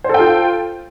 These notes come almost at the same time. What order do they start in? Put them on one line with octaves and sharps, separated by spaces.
C5 A4 G5 F4